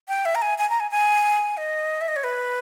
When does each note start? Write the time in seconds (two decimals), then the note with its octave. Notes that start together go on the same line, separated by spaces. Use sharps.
0.08 G5
0.25 E5
0.35 A#5
0.42 G#5
0.58 G#5
0.69 A#5
0.80 G#5
0.91 G#5
1.57 D#5
2.01 E5
2.08 D#5
2.16 C#5
2.24 B4